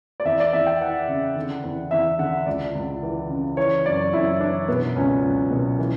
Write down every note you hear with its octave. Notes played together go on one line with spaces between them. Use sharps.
D5
E2 E5
D5
E2 E5
G5
E3 F#5
C#3
D3
E2
E2 E5
D3 F#5
C#2 D5
C#2
E3
C#3
E3 C#5
F#2 D5
F#2 E4
E3 D4
B2 B3
C#2 C#4
C#2
B2
E3